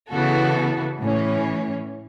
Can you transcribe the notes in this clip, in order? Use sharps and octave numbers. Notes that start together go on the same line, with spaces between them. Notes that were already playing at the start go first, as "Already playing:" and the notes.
C#3 E3 B3 F#4 A4
A2 E3 C#4